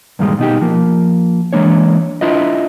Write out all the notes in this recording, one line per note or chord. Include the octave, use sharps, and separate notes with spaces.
G2 A#2 D#3 G3 G#3 D#4
B2 D#4 G4
F3 A#3
E3 G#3 A#3 D4 C#5
D4 E4 F4 B4 D#5